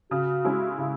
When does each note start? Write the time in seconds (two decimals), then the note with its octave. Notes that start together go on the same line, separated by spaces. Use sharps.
0.11 C#3 F#4
0.45 G#3 C#4 E4
0.78 C#3